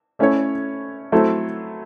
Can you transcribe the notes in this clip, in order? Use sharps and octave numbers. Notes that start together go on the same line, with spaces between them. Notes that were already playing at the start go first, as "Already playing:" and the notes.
A3 C#4 E4 A4 C#5
F#3 A3 C4 E4 A4